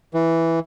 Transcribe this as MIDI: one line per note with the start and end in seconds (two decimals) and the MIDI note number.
0.14 0.60 52